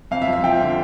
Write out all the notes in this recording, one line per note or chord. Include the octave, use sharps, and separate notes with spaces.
F2 F5
E5
F3
E5
F3 G5
D3